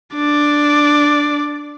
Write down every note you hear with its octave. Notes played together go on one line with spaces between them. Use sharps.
D4 D5